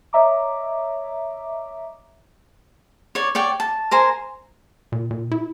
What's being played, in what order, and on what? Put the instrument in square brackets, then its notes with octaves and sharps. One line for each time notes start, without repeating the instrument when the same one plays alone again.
[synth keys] C#5 D#5 E5 A#5 D6
[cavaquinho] C#5 D5
C#5 D5 G5
A5
A#4 C5 G#5 A#5
[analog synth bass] A#2
A#2
E4